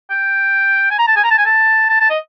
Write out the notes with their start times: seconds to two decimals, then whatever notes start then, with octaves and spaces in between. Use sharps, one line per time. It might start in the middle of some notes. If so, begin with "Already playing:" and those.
0.10 G5
0.91 G#5
0.99 A#5
1.07 A5
1.16 G#5
1.24 A#5
1.31 A5
1.38 G#5
1.46 A5
1.89 A5
2.00 A5
2.10 D#5